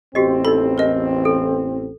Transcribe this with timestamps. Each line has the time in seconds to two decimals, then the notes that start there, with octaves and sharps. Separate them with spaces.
0.15 A1 E2 C4 F#4 G4 D#5
0.45 D#4 A4 B5
0.78 A#4 D#5
1.25 A4